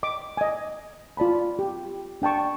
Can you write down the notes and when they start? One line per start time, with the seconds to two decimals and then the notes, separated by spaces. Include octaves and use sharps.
0.03 D#5 D6
0.37 D#5 G#5
1.17 F4 D5 A5 B5
1.59 G4
2.22 D4 G5 A5 C#6